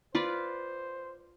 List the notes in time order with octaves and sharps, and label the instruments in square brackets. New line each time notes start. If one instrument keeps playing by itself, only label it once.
[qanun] F4 B4 D5 [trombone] C5